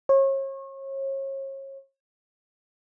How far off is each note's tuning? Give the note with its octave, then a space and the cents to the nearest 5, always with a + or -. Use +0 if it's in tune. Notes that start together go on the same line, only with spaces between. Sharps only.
C#5 -35